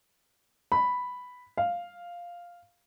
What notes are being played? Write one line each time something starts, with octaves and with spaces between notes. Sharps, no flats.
B5
F5